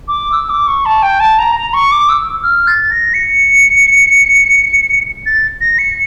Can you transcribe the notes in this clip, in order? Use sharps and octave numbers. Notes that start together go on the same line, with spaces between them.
D6
E6
D6
C#6
A5
G5
A5
A#5
A#5
C#6
D6
E6
F6
A6
A#6
C#7
A6
A#6
C#7